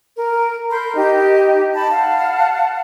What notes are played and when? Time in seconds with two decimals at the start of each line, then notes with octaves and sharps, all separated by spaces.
0.16 A#4
0.70 A#4 B5 C6 G6
0.95 D#4 G4 D#5
1.73 A5 B5
1.91 F5 F#5 A5